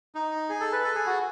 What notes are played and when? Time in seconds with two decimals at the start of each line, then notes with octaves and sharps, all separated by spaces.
0.15 D#4
0.49 G#4
0.61 A4
0.72 B4
0.84 A4
0.95 G#4
1.07 F#4